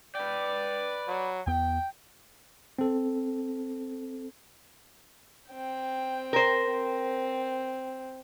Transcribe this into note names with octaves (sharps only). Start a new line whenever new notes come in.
B4 D5 G5
F#3
E2 B3 G5
C4 A4
C4 G5
A#4 C5
C4